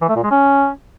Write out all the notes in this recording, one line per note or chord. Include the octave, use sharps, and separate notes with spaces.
E3
A3
A#2
G#3
C#4